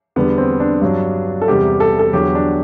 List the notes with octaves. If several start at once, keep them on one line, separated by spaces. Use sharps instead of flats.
E2 D3 G3 B3
C4
D4
G2 F#3
A4
E2 C3 G3 G4
A4
A4
E2 D3 F#3 G4
D4